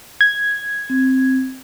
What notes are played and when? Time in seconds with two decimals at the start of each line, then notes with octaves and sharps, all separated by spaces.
0.21 G#6
0.90 C4